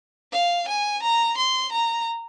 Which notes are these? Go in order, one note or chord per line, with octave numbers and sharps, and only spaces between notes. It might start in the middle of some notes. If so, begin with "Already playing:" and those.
F5
G#5
A#5
C6
A#5